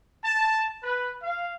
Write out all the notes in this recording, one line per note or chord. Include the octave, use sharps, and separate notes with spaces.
A5
B4
F5